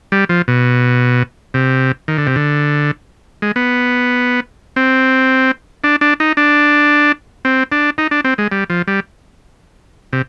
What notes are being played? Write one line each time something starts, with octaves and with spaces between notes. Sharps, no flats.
G3
F3
B2
C3
D#3
D3
C3
D3
G#3
B3
C4
D4
D4
D#4
D4
C4
D4
D#4
D4
C4
G#3
G3
F3
G3
C3